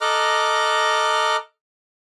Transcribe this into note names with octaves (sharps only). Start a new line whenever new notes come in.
A4 D#5 A#5 D6 F6 F#6